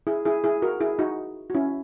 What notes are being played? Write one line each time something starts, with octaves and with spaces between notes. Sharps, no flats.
E4 G#4
E4 G#4
E4 G#4
F#4 A#4
E4 G#4
D#4 F#4
F#4
C#4 E4